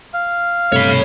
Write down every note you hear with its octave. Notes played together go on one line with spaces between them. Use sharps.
F5
G2 C3 A3 C#5 B5